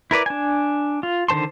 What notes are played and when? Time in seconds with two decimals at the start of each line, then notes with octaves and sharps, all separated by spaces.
0.11 E4 A#4 B4 D5
0.26 D4 G#5
1.03 F4
1.28 D3 D#3 C5 A5 C6